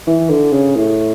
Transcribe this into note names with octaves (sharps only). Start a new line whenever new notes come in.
E3
D3
C#3
A2